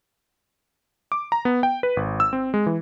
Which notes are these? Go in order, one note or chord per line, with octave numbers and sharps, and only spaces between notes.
D6
A#5
B3
G5
B4
G#1
E6
C4
G#3
E3